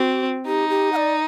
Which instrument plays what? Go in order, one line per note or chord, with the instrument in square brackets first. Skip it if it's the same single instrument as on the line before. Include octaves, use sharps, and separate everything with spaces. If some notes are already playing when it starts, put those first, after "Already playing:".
Already playing: [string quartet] C4 [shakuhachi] F#4
[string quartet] D#4 [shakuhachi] G4
[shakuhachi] G4
F#5
D5